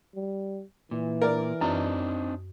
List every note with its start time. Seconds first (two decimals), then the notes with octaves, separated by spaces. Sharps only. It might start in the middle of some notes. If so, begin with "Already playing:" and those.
0.15 G3
0.91 A#2 E3
1.22 A#4 D5
1.61 F#2 C4 D4 D#4